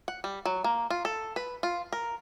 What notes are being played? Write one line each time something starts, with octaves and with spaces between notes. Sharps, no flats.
F#5
G3
F#3
A#3
F4
A4
B4
F4
A#4